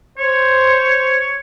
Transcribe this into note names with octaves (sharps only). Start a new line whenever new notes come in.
C5 C#5